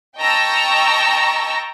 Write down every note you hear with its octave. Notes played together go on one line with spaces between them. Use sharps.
D#5 G5 A5 A#5 C#6 E6